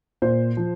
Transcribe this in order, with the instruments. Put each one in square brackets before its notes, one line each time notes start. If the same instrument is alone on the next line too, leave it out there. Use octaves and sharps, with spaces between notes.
[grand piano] A#2 C5
F3